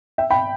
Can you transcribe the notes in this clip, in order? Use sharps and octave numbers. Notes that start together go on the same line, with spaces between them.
E5 G5
G5 B5